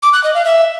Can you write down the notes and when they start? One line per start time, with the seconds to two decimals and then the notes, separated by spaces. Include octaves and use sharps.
0.02 D6
0.13 F#6
0.24 D#5
0.34 F5
0.45 E5